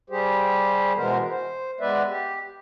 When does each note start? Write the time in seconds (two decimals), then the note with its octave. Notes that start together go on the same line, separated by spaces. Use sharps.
0.10 G3 G4 G#4 C5
0.96 B2 E3 G#3 B3 A#4 C5
1.30 C5
1.80 G#3 B3 B4 D5 E5
2.08 G4